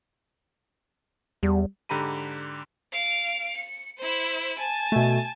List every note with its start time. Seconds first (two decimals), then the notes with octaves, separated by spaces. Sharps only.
1.43 E2 G3
1.89 G#2 D3 G4 A#5 B5 D#7
2.92 F5 D7
3.56 C#7
3.97 E4 C5
4.58 G#5 A5
4.92 B2 A3